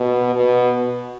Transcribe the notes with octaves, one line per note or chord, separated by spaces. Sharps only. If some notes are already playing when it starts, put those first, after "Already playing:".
Already playing: B2
B2